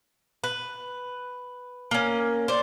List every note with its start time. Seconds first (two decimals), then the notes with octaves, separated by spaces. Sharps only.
0.44 B4
1.91 A#3 C#4
2.48 C5 D5